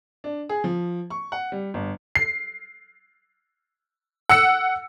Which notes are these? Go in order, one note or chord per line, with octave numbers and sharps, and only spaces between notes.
D4
G#4
F3
C#6
F#5
G3
G1
C7
F#5 E6 C#7